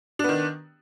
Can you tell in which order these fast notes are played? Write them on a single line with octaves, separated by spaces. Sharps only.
D4 B3 D#3